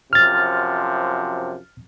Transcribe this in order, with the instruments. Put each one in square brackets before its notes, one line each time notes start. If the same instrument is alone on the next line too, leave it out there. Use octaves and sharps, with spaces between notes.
[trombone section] F#2 C3 F3 [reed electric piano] F6 A6